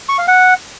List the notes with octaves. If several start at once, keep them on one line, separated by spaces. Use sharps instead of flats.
C#6
F5
F#5